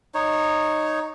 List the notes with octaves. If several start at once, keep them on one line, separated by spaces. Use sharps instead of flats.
D#4 C#5